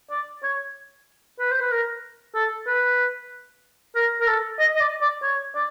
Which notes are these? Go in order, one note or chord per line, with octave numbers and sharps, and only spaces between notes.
D5
C#5
B4
C5
B4
A#4
A4
B4
A#4
A#4
A4
D#5
D#5
D5
D5
C#5
D5